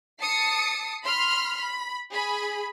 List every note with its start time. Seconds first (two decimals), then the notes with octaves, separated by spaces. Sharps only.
0.20 A5 D#6 C7 C#7
1.04 B5 C6 F6
1.58 B5
2.11 G#4 B5